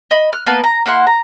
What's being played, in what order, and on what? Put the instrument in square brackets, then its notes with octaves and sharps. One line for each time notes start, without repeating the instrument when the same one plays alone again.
[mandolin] D#5 B5
F6 F#6
A#3 B3 B4 A5
A#5
A#3 E4 F#5 C6
A#5